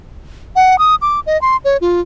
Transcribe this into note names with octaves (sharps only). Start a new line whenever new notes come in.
F#5
D#6
D6
D#5
C6
C#5
F4